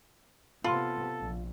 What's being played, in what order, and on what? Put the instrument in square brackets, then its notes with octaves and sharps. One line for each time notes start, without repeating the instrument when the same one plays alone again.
[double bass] C3 B3 [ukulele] F4 [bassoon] A4 [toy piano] B5 C6
[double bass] A#1